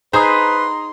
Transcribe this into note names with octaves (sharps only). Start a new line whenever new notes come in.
D#4 G#4 B4 C5 A#5 C6 D#6